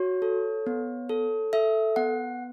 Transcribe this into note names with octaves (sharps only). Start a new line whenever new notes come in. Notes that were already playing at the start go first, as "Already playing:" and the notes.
Already playing: F#4 C#5
A4
B3
A4
A4 E5
B3 F#5